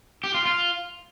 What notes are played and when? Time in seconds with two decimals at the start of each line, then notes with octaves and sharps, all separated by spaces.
0.24 G4
0.35 F4
0.45 F4